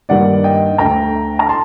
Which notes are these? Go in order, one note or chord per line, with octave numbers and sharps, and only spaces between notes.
G2 D#3 G3 A#3 D5 F#5
D#5 G5
D2 D3 A3 G5 A#5
A#5
A5 C6